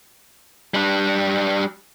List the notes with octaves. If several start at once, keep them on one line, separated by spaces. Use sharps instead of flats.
G3 D4